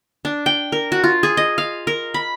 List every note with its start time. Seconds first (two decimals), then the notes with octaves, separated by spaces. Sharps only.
0.25 D4
0.46 G5
0.72 A#4
0.92 F#4
1.04 F4
1.23 G#4
1.37 D#5
1.58 F5
1.87 A#4
2.14 B5